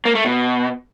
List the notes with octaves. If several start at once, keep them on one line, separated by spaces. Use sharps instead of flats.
A#3
A3
B2